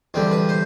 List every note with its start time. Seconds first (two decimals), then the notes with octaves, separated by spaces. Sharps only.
0.14 E2 D3 G3 C4
0.31 B4
0.49 C5